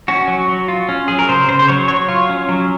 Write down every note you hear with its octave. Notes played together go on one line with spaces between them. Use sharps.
C#4 F#4
F#3
F#3
F4
C#4
F#3 G#4
A#4
C#3 C5
C#3 C5
C5
F#3 C#5
F#3 C#5
F4
C#4
F#3